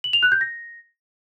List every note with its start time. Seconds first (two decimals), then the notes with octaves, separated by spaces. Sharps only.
0.04 F#7
0.13 F7
0.23 F#6
0.32 G6
0.41 A#6